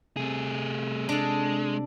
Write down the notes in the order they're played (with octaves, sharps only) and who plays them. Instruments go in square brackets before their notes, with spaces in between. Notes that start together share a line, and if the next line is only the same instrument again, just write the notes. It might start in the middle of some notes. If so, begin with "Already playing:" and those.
[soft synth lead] C3 [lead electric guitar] A3 G#4
[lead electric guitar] G#3 [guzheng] D4 A4